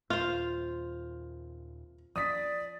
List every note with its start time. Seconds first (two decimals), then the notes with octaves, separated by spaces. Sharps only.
0.10 D#2 A#2 C4 F4 C5 F6
2.16 F3 D5 D#6 B6